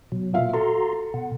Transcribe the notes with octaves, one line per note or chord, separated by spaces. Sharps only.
B2 F#3
A#2 E5 F5
F#4 A4 A#5 C6
B2 F#5